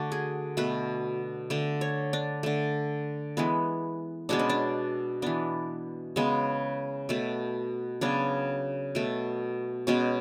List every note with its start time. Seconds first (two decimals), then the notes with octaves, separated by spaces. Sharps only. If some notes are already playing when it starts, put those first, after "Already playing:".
Already playing: D3 A3 D4 F#4
0.12 G#4
0.57 B2 A3 B4
1.50 D3 A3
1.81 C#5
2.13 D4
2.43 D3 A3
3.37 E3 G#3 B3
4.29 B2 G#3 B3 D4
4.39 C#4
4.49 D4
5.22 E3 B3 D4
6.16 C#3 G#3 B3
7.09 B2 A3
8.01 C#3 F#3 B3 D4
8.95 B2 A3
9.87 B2 G#3 B3 C#4